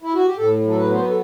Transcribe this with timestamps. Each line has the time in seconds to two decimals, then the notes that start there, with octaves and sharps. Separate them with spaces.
0.02 E4
0.14 F#4
0.26 G4
0.37 A2 A4
0.64 F#3 A4
0.77 B4
0.90 B3 C5
1.00 B4
1.08 A4